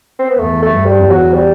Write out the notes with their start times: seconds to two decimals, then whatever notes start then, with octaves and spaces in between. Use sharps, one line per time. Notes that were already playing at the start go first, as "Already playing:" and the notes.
0.19 C4
0.29 B3
0.39 E2 A3
0.62 A3
0.71 G2
0.86 G3
1.02 E2
1.10 F#3
1.34 G3